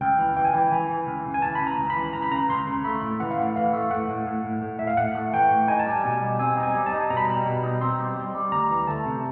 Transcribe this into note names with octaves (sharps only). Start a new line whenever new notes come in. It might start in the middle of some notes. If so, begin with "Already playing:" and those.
C#2 G5
E3
E3 G5
G#5
E3 G5
E3 G#5
E3
C#2
C#3
G#5
E3 A5
B5
C#2
A#5
C#2
B5
E3
C#2 A#5
B5
C#3 A#5
C#2 C6
C#3
A3 B5
A2
E3 F#5
F5
A2 F#5
E3 F5
A3
A2 F#5
A2
A2
A2
A2
A2 E5
F5
A2 F#5
A3
E3 G5
A2
D#4 G#5
A5
G3 G#5
B2 G#5
G3
C4 G#5
D#4
G#5
G3
A5
D#4
B2 A#5
B5
G3 A#5
B2
D#4
C4 C6
G3
G3
G3
D2 A#5
E3
A3 A5
C3